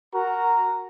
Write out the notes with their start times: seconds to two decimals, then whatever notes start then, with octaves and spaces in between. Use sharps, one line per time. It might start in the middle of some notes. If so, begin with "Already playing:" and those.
0.14 F#4 A#4 A#5